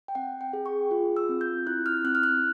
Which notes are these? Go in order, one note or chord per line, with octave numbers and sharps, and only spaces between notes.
G5
C4 F#5
G5
G#4
C#6
F4
E6
C4
G6
E4 F#6
F6
C4 F#6
F6
F#6